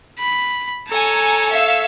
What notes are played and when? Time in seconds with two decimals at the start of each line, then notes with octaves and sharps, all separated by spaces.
0.19 B5
0.88 A4 C#5 G#5 A#5
1.50 E5 F5 E6